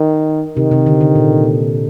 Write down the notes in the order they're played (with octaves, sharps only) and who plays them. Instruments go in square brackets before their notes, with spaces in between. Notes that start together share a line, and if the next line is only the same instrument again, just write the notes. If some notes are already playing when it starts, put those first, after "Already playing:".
Already playing: [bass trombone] D#3
[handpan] C3 [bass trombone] D#3
[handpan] C3
D3
D3
A#2